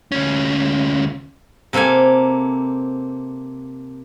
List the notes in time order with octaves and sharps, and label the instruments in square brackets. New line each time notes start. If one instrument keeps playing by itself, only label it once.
[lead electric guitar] D2 C#4
[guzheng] C3 A#3 A4 F5 G#5